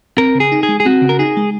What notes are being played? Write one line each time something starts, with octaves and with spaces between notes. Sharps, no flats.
C4 A#4
C#3
G#4
D#4
G#4
G#3
G#4
C4 F#4
C#3
A#4
D#4 G#4
G#3